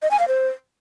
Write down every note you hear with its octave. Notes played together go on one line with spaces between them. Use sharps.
D#5
G#5
F5
C5